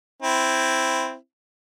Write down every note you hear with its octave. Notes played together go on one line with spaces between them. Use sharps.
C4 E4